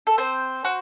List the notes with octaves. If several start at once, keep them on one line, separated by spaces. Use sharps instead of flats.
A4
C4 C5
F#4